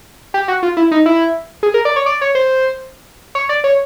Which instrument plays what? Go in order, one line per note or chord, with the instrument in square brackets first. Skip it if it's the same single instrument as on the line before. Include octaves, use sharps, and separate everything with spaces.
[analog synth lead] G4
F#4
F4
E4
D#4
E4
G#4
A#4
D5
C#5
D5
C#5
C5
C#5
D5
C#5